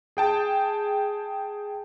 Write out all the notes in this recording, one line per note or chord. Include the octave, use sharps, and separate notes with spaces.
G#4 G5 A5